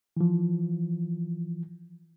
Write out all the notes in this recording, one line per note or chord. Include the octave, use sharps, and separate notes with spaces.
E3 F3